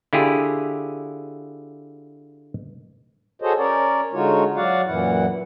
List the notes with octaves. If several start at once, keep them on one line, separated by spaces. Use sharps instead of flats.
D3 E4 F4 G4 G#4
F#4 G#4 A4 C5 C#5 D#5
C#4 A#4 C#5 D5
D3 G#3 D#4 F4 F#4 C#5
F#3 F#4 D5 F5 F#5
F#2 A#2 E3 E4 F#5